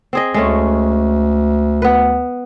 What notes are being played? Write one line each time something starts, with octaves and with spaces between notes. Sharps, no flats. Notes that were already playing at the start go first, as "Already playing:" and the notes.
C4 G#4 D#5
D2 G#3 A3 C#4
B3 B4